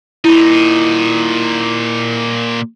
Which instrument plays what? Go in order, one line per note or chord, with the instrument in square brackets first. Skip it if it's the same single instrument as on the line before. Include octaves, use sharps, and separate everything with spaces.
[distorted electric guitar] A#2 D#4 [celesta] E4